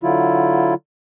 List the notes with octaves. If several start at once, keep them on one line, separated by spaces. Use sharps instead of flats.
D3 F#3 E4 F4